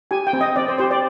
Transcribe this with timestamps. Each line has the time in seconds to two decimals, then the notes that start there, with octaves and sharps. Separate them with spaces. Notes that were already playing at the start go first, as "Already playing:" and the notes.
0.11 G4 G#5
0.27 G5
0.33 C4
0.41 D#5
0.56 C4 D5
0.68 C5
0.78 G4 C5
0.91 D5